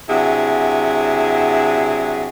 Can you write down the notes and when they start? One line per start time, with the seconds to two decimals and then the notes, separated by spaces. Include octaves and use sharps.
0.09 C3 F#3 D4 E4 G#4 F#5